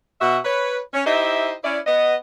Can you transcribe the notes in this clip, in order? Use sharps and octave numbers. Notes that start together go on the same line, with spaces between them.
B2 F#4 E5
B4 C#5
C#4
D#4 E4 G4 C5 D#5 E5
C#4 E4 D5
B3 D#5